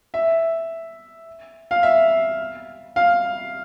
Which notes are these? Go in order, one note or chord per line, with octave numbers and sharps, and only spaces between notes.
E5
F5
E5
F5